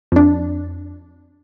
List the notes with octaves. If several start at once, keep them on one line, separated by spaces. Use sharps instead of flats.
F2 D4